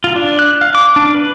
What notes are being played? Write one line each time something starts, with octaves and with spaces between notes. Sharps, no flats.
F4
D4
F#6
F5
D6
D4
B4